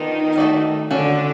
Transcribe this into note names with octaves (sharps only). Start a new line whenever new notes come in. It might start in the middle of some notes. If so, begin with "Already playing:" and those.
Already playing: D#3 B3 D4 D#4 F4 A#4
A3 C#4 F#4 A4 D5
D3 C#4 D4 F#4 A4